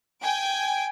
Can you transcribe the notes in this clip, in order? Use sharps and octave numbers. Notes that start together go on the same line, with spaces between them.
G5 G#5 D7